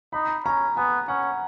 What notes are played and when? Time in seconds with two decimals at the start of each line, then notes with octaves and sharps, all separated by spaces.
0.13 D#4 B5
0.45 C#4 A#5
0.77 B3 G#5
1.08 C#4 F#5